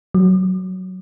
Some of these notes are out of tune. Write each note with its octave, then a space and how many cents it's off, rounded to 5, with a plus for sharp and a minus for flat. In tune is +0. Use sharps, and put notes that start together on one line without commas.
F#3 +5